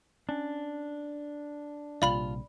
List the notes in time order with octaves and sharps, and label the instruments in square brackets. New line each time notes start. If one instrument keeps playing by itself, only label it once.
[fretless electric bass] C#4 [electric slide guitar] D4
[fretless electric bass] A#1 C3 G3 [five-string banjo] F4 [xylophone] D5 B5 F#7